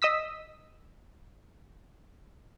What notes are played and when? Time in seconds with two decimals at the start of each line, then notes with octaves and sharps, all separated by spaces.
0.02 D#5 D#6 E6 B6